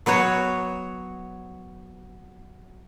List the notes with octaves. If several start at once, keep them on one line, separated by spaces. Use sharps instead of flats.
F#3 B3 F#4 C#5